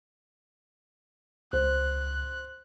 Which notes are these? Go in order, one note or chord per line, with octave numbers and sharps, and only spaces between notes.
C#2 C5 F#6